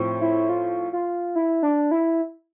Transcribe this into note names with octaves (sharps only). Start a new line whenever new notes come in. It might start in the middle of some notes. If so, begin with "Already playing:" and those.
Already playing: A2 F3 C4
E4
F4
F4
E4
D4
E4